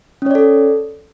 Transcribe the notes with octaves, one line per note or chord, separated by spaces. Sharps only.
C#4 A4 C#5 D5